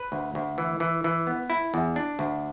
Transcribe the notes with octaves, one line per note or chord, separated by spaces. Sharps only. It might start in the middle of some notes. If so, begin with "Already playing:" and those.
Already playing: B4
D2
D2
E3
E3
E3
B3
E4
E2
D4
D2